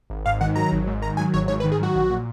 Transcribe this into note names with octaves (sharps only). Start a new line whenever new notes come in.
G#1
G#2 F5
D#3 F#5
F#3 A#5
G#1
G#2
D#3 A#5
F#3 G#5
G#1 C#5
G#2 C#5
B4
D#3
G#4
F#3 F#4
A#1
A#2